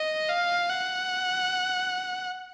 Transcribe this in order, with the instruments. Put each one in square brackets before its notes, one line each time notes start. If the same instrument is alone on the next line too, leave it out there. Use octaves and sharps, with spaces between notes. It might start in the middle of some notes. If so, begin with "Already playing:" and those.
Already playing: [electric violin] D#5
F5
F#5